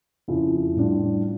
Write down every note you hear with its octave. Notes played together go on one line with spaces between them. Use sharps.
F2 C#3 F3 C#4 E4
A2 G3 D4 F4